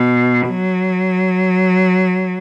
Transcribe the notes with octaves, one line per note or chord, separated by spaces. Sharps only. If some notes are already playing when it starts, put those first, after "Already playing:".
Already playing: B2
F#3